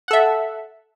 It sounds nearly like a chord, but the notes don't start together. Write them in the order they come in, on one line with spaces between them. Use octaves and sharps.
F#5 A4 E5